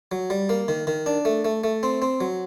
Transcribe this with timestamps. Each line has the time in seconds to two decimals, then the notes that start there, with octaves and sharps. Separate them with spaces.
0.12 F#3
0.30 G3
0.49 A#3
0.68 D#3
0.87 D#3
1.06 D4
1.25 A3
1.45 A3
1.64 A3
1.83 C4
2.02 C4
2.21 F#3